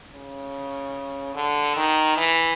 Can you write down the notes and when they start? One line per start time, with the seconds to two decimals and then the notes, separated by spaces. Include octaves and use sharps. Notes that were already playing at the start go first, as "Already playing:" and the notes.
0.11 C#3
1.35 D3
1.76 D#3
2.17 E3